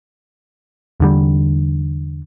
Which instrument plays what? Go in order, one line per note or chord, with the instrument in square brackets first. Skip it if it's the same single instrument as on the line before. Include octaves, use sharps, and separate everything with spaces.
[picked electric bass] E2 D3 G3